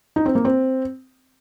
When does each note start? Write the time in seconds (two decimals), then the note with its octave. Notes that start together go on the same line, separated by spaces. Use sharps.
0.16 D#4
0.26 C4
0.35 A#3
0.45 C4